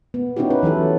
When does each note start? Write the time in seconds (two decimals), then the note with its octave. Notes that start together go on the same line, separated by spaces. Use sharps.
0.14 B3
0.36 B3 C#4 D#4 E4 F#4 G4
0.50 B4
0.63 E3 F#3 E4 A4